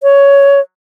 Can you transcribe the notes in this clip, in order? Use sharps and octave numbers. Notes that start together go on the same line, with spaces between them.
C#5